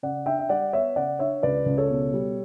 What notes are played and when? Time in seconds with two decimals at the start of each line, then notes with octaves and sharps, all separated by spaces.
0.03 C#3 D5 F#5
0.26 D4 E5 G5
0.39 E5
0.49 G3 D5 F#5
0.73 B3 C#5 E5
0.96 C#3 D5 F#5
1.19 D4 C#5 E5
1.43 C#2 B4 D5
1.66 C#2
1.78 A4 C#5
1.90 B2
2.14 G3